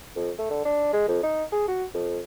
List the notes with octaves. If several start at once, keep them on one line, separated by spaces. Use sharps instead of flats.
F2
A3
D3
D4
G#3
F2
D#4
G#4
F#4
F2